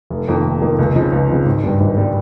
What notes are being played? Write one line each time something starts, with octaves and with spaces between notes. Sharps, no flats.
F1
F2 D#3 A#3
F1
F2 D#3 A#3
C#2
C#3 F3 C4 D#4
C#2
C#3 F3 C4 D#4
G#1
G2 G3
G#1
G3